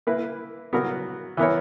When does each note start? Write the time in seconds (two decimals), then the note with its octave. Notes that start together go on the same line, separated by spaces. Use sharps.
0.07 A#3 E4 B4
0.73 F#3 B3 F#4 A#4
1.37 E3 B3 E4 A#4 C#5